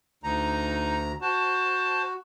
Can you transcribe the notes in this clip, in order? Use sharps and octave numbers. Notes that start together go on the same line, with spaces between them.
D2 D#4 A#5
F#4 C5 A5